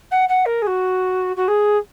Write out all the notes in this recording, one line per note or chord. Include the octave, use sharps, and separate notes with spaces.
F#5
F#5
A#4
G#4
F#4
F#4
G#4